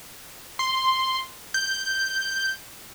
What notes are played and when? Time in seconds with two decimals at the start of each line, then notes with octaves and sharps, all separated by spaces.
0.59 C6
1.54 G6